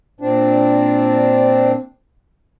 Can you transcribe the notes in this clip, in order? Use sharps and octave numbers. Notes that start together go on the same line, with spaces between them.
A#2 C4 D4